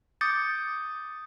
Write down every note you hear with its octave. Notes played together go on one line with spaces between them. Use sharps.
D6 D#6 G6 A6 C#7